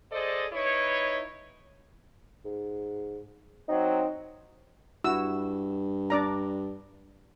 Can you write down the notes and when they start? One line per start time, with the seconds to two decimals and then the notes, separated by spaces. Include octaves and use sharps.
0.11 G#4 A4 C5 D5 D#5
0.53 D#4 E4 B4 C#5
2.45 G#2
3.68 F#3 C4 D#4
5.04 G2 E4 F#4 E6
6.10 D4 D5 A#5